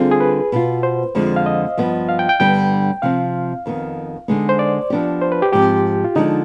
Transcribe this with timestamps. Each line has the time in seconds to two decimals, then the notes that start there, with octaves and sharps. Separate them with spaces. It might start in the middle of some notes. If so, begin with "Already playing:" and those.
Already playing: D3 G3 C4 F4 G#4
0.11 G#4
0.20 B4
0.52 B2 B3 F4
0.83 C5
1.15 F2 D3 F3 G#3
1.36 F5
1.46 D#5
1.77 G2 F3 B3
2.09 F5
2.19 G5
2.29 G5
2.40 G2 D3 G3 B3 D4 G5
3.02 C3 F3 C4 F5
3.66 F2 D#3 B3
4.28 D3 G#3 B3 D#4
4.49 C5
4.59 D5
4.90 F3 B3 D4 G4
5.21 C5
5.32 B4
5.42 G4
5.53 G#2 F3 C4 G4
6.04 F4
6.15 D3 F3 G#3 D4 D#4